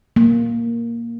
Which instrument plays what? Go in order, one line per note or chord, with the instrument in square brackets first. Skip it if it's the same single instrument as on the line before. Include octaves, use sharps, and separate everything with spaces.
[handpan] A#3